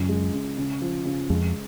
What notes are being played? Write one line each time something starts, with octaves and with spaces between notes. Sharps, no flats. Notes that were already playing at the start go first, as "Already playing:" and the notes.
Already playing: F#2 C#3 F#3 F4
G#3
C#3
C#3
F3
C#3
F2 F3 G#3